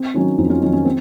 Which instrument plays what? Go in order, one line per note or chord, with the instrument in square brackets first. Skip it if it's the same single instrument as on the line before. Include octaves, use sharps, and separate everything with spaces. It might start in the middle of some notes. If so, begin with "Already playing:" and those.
Already playing: [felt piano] C4
D#3 F#3 C#4
F2 C4 D#4
C#4 F4
D#3 F#3 C#4
C#4
C4